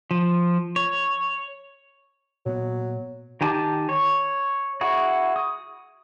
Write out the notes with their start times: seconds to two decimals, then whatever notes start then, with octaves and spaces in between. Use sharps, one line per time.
0.11 F3
0.76 C#5
2.46 A#2 F#3 B3
3.41 D#3 G4 G#5 A5 D6
3.89 C#5
4.81 E4 F#4 G#4
5.36 D#6